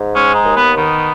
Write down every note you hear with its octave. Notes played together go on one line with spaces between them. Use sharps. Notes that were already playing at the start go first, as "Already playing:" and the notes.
Already playing: G#2
G#3 C#4
D#4
D#2
B3
D#3 B3